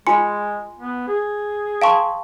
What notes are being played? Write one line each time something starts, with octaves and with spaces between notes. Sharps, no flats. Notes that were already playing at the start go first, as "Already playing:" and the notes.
G#3 F4 G#5 C6 C#7
B3
G#4
F5 G5 A5 C6 C#6